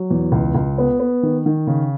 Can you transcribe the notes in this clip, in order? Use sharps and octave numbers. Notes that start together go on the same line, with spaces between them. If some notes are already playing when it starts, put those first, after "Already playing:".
Already playing: F#3
E2
C#2
C#2
B3
B3
D#3
D#3
C#3